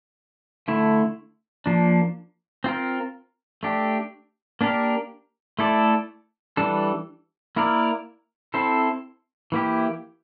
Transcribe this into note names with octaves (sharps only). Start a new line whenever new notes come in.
D3 A3 E4
F3 A#3 D4
C4 F4 A#4
A3 D4 G4
A#3 D4 G4 A#4
A3 E4 A4 D5
E3 G3 D4 A4
A#3 E4 A#4 D5
C4 E4 A4 C5
E3 A#3 E4 G4